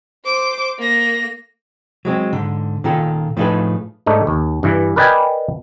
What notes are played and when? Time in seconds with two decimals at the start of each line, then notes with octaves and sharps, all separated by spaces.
0.25 C5 D6
0.79 A#3 A#6
2.05 F#3 G#3 C4
2.33 G#2 D3
2.84 A#2 D#3 F4 A4
3.37 A2 F3 A3 D#4 G#4 B4
4.06 G#2 A3 D4 D#4
4.27 D#2
4.63 G2 E3
4.96 A#4 B4 D5 D#5 G5 G#5